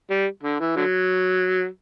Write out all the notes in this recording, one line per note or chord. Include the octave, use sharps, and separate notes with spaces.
G3
D3
E3
D3 F#3